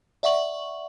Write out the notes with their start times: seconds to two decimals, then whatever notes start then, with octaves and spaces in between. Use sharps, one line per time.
0.23 D5 E5 F#5 C#6 F#7